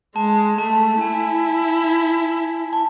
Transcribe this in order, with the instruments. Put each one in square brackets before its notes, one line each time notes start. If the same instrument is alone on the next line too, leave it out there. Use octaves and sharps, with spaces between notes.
[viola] G#3 [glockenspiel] A5
[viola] A3 [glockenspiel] A5
[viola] E4 [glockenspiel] G#5
[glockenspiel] A5